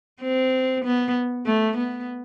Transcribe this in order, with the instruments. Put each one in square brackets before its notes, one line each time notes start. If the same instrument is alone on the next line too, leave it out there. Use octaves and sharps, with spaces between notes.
[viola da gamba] C4
B3
A3
B3